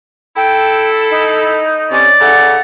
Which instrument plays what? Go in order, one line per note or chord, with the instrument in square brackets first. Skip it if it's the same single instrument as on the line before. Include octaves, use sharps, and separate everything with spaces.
[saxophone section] E4 A4 [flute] G5
[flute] D#4
[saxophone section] C3 C#4 [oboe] D5
[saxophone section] C#3 E4 A4 [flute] F#5